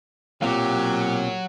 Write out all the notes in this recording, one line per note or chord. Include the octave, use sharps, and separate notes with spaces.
B1 A#2 F#3 C4 G4 F5